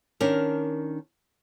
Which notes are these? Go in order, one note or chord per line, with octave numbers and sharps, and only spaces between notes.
D#3 C#4 D4 A#4